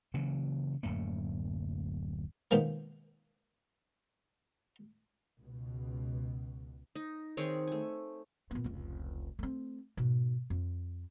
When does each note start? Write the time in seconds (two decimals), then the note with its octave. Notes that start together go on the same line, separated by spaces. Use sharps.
0.14 C#3 E3 F#3 A#3
0.83 D1 F#2 A3 A#3
2.51 B2 D#3 F3 G#3 A#3
5.41 C#2 B2
6.96 D#4
7.37 D#3 C4 G#4 C#5
7.67 A3 G#5
8.51 A#2 B3
8.64 F1 C#2
9.39 A3 C4
9.97 G#2 B2
10.50 F2